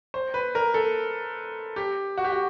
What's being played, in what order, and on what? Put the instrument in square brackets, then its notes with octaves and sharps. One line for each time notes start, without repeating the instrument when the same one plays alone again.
[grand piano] C5
B4
A#4
A4
G4
F#4
G4
F#4